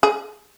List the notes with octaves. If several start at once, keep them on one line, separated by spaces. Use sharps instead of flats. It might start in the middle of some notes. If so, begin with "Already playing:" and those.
G#4